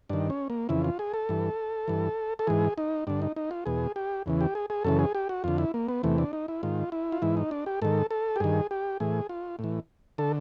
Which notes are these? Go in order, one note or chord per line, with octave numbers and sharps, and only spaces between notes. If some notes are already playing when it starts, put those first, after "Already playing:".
G2 D#3 D4
C#4
A#3
F2 C#3 E3 E4
F4
G#4
A4
G2 E3
G2 E3
A4
G#2 E3 G#4
D#4
G2 D3 D4
D#4
D#4
F4
E2 B2 G#4
G4
E2 C#3 E3
G4
G#4
G#4
F#2 C#3 E3 A4
G#4
G4
F#4
F2 D3 F4
E4
A#3
B3
E2 C3 E3 A3
D4
D#4
E4
G#2 D#3 F4
E4
F4
G#2 E3 E4
D#4
D4
G4
G#2 D#3 A4
A4
G4
G2 D#3 G#4
G4
A2 E3 G#4
F4
A2 E3
D3 A4